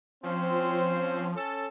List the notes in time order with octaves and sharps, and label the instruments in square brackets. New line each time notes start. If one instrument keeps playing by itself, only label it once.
[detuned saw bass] F3 [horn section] C4 C#4 C5
[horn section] C#4 A4